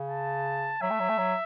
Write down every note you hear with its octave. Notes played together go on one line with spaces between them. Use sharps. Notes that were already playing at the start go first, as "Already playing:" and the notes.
Already playing: C#3
A5
F#3 E5
A3
F#3
A3
F#3